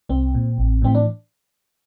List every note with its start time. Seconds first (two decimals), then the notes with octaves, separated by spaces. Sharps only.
0.09 C2 C4
0.34 A#2
0.58 A1
0.82 A2 E3 C4
0.95 D4